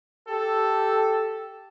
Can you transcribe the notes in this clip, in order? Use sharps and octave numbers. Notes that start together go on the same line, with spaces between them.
G4 A4